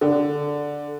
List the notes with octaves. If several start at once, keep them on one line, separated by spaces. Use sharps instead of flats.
D3